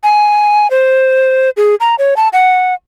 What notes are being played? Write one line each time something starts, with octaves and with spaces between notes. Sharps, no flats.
G#5
C5
G#4
A#5
C#5
A5
F#5